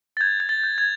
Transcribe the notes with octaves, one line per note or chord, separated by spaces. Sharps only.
A6
G6 G#6
G#6
A6
G6
G#6